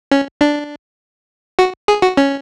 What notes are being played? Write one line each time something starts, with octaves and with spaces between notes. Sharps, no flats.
C#4
D4
F#4
G#4
F#4
C#4